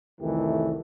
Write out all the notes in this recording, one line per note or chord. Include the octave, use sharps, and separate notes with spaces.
C2 F2 D#3 E3 A3 G4